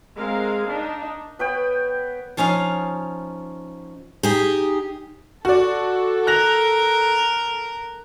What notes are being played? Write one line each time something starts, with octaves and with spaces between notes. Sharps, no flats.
G#3 C4 A#4 F5
D4 D#4
B3 B4 C#5 G5
F3 C#4 D#4 F5
D#4 G4 G#4
F#4 A4 D5
A#4 F#6 A#6 F7